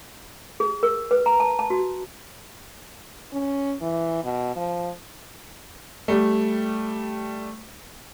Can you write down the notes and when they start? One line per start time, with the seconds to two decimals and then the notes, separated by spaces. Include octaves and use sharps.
0.60 G#4
0.83 A#4
1.11 B4
1.26 A#5
1.40 A5
1.59 A5
1.70 F#4
3.33 C#4
3.82 E3
4.24 B2
4.56 F3
6.08 G3 A3